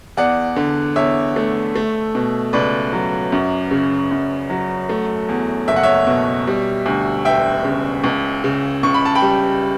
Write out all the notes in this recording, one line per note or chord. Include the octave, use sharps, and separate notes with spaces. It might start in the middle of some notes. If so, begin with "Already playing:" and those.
E2 D5 F#5
D3
E2 C#5 E5
A3
A3
B2
C#2 B4 D5
F#3
F#2
C#3
F#2
F#3
A3
E2
F#1 E5
F#5
C#5 E5
B2
G3
D2
E1 E5 G5
C#3
C#2
C#3
C#2 C#6
B5
A5
G5 B5
G3